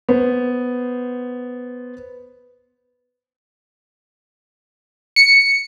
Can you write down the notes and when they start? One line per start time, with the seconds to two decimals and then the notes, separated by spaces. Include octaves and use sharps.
0.09 B3 C5
5.16 C#7